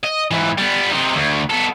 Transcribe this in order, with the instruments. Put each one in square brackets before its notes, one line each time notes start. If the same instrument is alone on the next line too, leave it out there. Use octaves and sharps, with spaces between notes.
[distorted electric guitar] D#5
G#2 E3
G3 B3
C3 D#4
D2
B3 A4